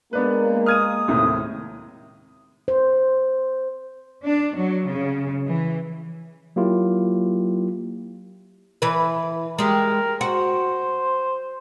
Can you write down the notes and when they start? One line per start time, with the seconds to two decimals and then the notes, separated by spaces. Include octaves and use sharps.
0.13 G#3 A#3 B3 D4 B4
0.66 D#6 F6 G#6 D#7
1.08 D#2 A2 C3
2.68 C5
4.23 D4
4.55 F#3
4.85 C#3
5.45 E3
6.56 F#3 A#3 E4 F4 G4
8.82 E3 B4
9.58 G#3 G4 A#4
10.21 F#4 C5